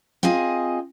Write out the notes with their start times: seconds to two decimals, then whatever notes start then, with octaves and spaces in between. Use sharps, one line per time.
0.23 C4 F4 G#4 D#5 G#5